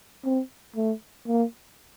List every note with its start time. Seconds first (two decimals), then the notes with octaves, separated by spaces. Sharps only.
0.24 C4
0.76 A3
1.28 A#3